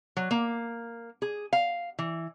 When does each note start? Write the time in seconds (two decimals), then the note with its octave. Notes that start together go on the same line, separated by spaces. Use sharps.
0.17 F#3
0.31 A#3
1.22 G#4
1.53 F5
1.99 E3